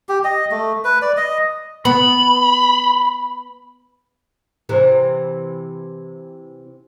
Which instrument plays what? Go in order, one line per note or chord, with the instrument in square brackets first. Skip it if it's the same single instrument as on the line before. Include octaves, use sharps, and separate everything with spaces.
[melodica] G4
D#5
A3
B4
D5
D#5
[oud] B3 [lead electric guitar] B5
[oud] C3 E3 C4